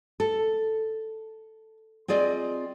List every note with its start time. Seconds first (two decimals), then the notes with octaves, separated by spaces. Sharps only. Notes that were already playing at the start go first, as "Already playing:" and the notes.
0.20 A4
2.08 C4 F4 G#4 D5 D#5